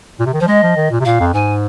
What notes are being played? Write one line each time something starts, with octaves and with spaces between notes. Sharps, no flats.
A#2
C3
D#3
F3 C5
G#3 D#5
F3
D#3
A#2
C3
A#2 F5
F2
G#2 G#5